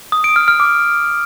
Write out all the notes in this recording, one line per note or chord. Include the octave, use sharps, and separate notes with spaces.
D#6
D7
F6
F6
D6